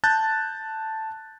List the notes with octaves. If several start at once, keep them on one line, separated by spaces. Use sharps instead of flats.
A5 F#6 G6 A6